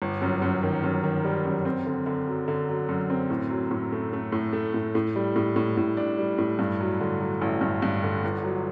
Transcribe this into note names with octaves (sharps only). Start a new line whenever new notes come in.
G1
F#2
F#2
D#3
F#2
D#3
G3
F#2
C4
D3
D3
F#3
D3
F#3
F#2
C4
A2
F#3
A2
A3
A3
A2
A3
A2
A2
G3
A2
A2
A2
D4
G3
A2
G2
F#3
D3
F#3
A1
G2
G2
D3
G1
F#3